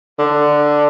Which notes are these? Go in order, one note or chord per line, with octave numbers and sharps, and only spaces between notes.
D3